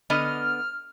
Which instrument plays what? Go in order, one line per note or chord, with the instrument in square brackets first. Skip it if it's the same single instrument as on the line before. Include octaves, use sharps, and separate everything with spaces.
[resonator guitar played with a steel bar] D3 B3 D#5 [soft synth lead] F6